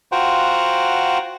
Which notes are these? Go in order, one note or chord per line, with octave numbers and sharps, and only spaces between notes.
F4 F#4 C5 F#5 G5 A#5